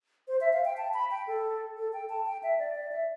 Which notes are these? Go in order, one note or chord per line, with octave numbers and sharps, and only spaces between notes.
C5
E5
F5
G5
A5
B5
G5
A4
A4
G5
A5
G5
E5
D5
D5
E5